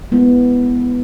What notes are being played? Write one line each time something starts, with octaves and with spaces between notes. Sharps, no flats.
G#3 B3 E4